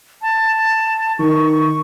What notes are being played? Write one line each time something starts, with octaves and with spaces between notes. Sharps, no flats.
A5
D#3 C#6